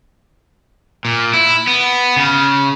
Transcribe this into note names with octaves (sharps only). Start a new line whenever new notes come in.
A#2
E4
B3
C#3